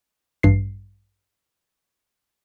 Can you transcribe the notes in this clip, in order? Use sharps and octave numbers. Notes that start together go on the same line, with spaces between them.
A1 G2 C7